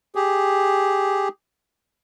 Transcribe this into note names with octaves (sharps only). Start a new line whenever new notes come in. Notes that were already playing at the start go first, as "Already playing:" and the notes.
G4 G#4